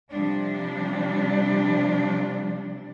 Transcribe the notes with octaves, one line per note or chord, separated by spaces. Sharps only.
C3 F3 G3 D4